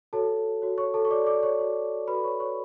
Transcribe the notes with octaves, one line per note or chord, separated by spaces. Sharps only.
F#4 A4 C#5 A5
F#4 C#5
C#5 C#6
A4 A5
C#6
F#4 C#5 D5 D6
D5 D6
C#5 C#6
F#4 C#5
F#4 A4 B4 D5 B5
C#5 C#6
C#5 C#6